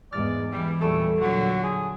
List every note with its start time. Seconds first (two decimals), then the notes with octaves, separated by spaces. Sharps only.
0.12 E2 G#2 G#3 D5 F6 A6
0.52 E3 G3
0.81 E2 A#2 G3 A3 A4 E6 D7
1.20 A#2 D3 F#3 F#4
1.63 G#4